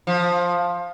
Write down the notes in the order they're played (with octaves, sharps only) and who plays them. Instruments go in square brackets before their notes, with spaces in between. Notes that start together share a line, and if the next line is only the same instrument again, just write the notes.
[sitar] F3